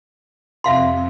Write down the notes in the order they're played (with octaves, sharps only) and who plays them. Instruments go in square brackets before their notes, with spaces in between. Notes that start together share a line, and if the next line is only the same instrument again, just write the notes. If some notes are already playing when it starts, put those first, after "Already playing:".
[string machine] F2 C3 [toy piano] E5 F5 C6